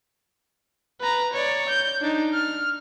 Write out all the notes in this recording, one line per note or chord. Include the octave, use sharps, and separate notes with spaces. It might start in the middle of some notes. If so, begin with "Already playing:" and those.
B4 A#5
C#5 D5
G6
D4 D#4
F6